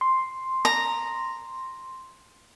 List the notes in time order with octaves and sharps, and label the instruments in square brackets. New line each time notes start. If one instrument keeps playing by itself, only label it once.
[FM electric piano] C6
[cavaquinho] A#5